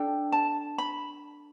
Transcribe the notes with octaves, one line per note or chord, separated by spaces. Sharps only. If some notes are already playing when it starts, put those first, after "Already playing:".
Already playing: D4 A4 G5
A5
B5